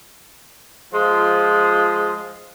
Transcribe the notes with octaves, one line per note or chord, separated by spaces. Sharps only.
F3 G#3 F4